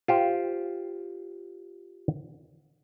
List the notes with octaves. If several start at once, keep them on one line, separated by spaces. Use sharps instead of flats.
F4 G4 C5